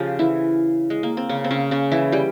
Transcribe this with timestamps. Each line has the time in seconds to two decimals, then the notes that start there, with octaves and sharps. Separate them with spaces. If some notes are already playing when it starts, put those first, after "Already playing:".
Already playing: C#3 F3 C#4 F4 G4
0.19 E3 E4
0.90 G#3
1.03 A#3
1.17 C4
1.29 C#3 C#4
1.44 C4
1.51 C#3 C#4
1.71 C#3 C#4
1.92 E3 E4
2.12 G3 G4